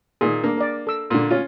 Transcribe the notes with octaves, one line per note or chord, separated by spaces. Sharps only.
A#2 D#3 G#4
A#3 D4
A#4 D5
A4 E6
A#2 D3
C#4 F4